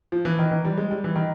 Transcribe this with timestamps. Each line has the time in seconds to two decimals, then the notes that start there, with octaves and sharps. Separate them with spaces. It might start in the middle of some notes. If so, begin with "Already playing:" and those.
0.12 F3
0.25 E3
0.39 D#3
0.51 E3
0.65 G3
0.78 G#3
0.91 G3
1.04 E3
1.16 D#3